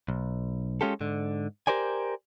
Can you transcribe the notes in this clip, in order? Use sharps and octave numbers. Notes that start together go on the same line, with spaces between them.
B1
G#3 C#4 F4 G4 A4
G#2 D3
G4 A#4 C5 D5 G#5